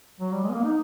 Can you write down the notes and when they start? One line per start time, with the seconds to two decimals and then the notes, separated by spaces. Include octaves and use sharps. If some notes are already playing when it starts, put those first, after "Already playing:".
0.20 F#3
0.32 G3
0.43 G#3
0.49 B3
0.54 A#3
0.65 D#4